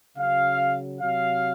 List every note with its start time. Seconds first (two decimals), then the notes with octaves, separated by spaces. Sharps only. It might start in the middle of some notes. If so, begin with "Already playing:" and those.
0.17 C#3 F#3 F5
1.01 C3 F#3 F5